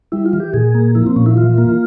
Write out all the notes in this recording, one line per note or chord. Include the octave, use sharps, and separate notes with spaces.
G3 E4
F4
E3
G4
A#2 G#4
A#3
F3 E4
C4
A#2 C#4
E4
E3 F4
A#3